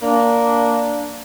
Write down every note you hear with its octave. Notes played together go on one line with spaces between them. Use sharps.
A#3 D4